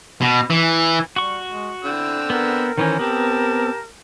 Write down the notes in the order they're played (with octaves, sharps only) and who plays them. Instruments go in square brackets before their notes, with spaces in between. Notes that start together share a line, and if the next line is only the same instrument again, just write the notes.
[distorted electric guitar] B2
E3
[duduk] G3 [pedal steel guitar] F#4 C#6
[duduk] G#3
[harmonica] D3 C4 E6 [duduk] E4
[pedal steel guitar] B3 [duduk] A#4
[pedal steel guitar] D#3 E3 C#4 [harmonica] C5
[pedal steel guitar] B3 C4 [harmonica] G4 A5